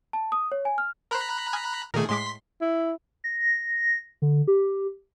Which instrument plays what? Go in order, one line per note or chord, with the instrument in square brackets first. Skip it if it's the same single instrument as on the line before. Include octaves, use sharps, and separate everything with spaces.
[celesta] A5
D#6
C#5
G#5
F6
[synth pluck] A#4 C5 [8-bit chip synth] A#5 B5 F#6
[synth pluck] G#5 D#6 F6
[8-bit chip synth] A#2 D#3 G#4 [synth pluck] A3 A#4
[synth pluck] A2 G#3 D6 [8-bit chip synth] C6 B6
[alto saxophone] E4
[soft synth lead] A#6
D3
G4